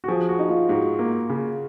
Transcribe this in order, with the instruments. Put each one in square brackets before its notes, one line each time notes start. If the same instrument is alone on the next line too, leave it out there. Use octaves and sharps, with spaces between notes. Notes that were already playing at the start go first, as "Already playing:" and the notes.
[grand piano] F#4
[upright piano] F3 [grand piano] G#4
[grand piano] F#4
[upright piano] D#4
[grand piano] F4
[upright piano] G#2 [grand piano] F#4
[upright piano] A#3
C#3